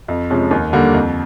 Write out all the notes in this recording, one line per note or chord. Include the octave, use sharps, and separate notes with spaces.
F2
C3 F3 G#3 C#4
D#2
D3 G3 A#3
F2